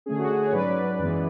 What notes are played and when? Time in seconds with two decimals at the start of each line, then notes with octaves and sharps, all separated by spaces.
0.06 D3 A3 C#4 G#4
0.19 F#4
0.33 G#4
0.47 C#5
0.52 G#2 F#3 C#4 B4 D5
0.99 F#2 E3 G#3 B3